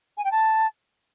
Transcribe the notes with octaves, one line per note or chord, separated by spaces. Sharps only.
G#5
G5
A5